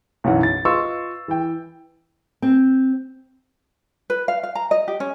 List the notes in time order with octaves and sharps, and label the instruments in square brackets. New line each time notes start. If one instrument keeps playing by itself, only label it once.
[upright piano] B1 F#2 E3 F#5
A6
F4 B4 D#5 C6 C#6 E6
E3 G5
[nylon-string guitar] C4
[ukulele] B4
F5
F5
A#5
D#5
G4
C#4